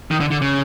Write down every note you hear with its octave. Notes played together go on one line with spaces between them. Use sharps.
D#3
D3
D3
C#3